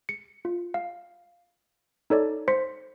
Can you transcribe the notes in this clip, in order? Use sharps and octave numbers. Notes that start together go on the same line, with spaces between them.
C#7
F4
F5
D#4 A4 C#5 D5
C5 C6 B6 C#7